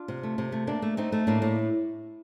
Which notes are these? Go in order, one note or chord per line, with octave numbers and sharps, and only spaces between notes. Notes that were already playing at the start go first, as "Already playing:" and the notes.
Already playing: D4 F4
C3
A3
C3
A3
A3 A#3 D4
A3
A3 C4 D#4
A3
A2 A#3 D4
A2